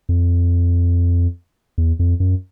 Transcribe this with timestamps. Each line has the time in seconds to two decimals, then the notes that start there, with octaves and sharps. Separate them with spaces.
0.09 F2
1.78 E2
1.99 F2
2.20 F#2